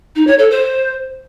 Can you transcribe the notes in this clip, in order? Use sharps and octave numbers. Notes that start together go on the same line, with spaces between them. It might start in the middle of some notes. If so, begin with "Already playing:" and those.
D#4
C#5
A4
C5